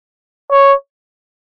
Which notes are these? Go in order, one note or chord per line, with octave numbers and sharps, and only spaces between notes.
C#5